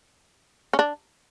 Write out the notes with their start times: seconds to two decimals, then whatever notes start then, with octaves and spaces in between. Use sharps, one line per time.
0.73 C#4
0.79 D4